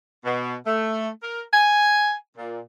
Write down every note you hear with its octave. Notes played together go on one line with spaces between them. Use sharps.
B2
A3
A#4
G#5
A#2